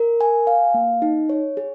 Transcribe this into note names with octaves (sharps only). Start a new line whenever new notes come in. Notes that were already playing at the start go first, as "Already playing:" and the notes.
Already playing: A#4
G#5
F5
A#3
D#4
C#5
G#4